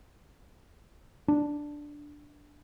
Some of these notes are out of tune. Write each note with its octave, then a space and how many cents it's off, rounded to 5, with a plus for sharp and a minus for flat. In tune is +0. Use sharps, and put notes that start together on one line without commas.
D4 +0